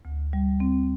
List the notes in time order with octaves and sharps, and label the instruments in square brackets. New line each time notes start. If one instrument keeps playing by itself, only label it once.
[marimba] D2
G3
C4